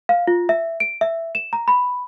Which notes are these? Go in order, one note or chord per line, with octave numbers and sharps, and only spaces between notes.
F5
F4
E5
D7
E5
E7
A#5
B5